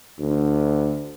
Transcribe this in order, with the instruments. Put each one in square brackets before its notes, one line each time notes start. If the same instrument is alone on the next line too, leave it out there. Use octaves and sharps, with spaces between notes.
[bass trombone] D2